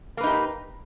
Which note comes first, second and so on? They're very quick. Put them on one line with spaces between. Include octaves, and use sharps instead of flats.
A#3 B4 D#4 G4